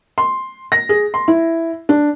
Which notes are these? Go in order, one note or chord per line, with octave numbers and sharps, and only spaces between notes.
C6
A#6
G#4
C6
E4
D4